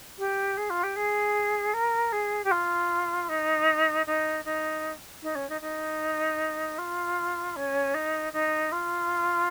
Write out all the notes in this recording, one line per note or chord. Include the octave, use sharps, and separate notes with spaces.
G4
G#4
F4
G4
G#4
A#4
G#4
G4
F4
D#4
D#4
D#4
D#4
C#4
D#4
D#4
F4
C#4
D#4
D#4
F4